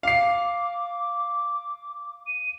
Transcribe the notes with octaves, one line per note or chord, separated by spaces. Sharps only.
F5 D6 C7
D#7